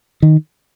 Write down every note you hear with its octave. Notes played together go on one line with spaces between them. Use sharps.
D#3